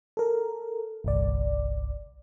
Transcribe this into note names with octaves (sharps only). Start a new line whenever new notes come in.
A4 A#4
G1 C2 D5